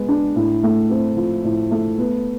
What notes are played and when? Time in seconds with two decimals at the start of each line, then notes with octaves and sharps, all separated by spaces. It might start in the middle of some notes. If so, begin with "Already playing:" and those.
Already playing: G#3 B3
0.09 D4
0.36 A2
0.63 A3
0.90 C4
1.17 F3
1.44 A2
1.71 A3
1.98 B3